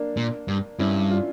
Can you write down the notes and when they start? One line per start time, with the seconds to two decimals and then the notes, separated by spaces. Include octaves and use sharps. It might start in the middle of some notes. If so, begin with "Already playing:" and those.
Already playing: A#3 D4
0.17 A#2
0.48 G2
0.79 G2 C#4 E4
1.11 D4 F4